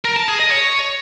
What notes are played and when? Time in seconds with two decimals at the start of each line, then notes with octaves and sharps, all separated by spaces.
0.05 A#4
0.16 A5
0.28 G#4
0.39 D#5
0.51 C#5